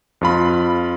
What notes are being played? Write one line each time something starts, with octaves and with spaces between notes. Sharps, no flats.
F2 F4 B5